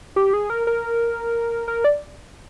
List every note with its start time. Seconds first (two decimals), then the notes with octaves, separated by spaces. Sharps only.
0.16 G4
0.34 G#4
0.50 A#4
0.67 A#4
1.68 A#4
1.84 D5